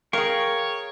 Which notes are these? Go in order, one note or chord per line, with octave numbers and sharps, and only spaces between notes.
G#4 A#4 C#5 F5 G5 C#6